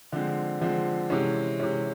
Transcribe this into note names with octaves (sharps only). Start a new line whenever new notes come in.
D3 F3 G#3 C4
D3 F3 G#3 C4
C3 E3 G#3 C#4
C3 E3 G#3 C#4